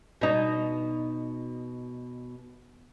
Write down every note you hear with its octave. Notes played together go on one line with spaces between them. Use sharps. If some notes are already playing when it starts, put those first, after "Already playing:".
B2 D#4